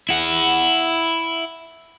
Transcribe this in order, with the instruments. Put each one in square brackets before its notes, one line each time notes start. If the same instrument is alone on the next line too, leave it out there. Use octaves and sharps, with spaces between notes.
[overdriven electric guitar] E4 F#5